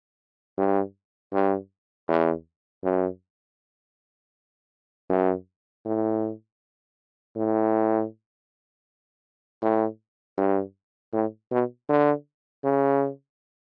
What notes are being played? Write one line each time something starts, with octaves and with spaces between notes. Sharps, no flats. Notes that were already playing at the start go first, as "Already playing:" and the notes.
G2
G2
E2
F#2
F#2
A2
A2
A2
G2
A2
B2
D3
C#3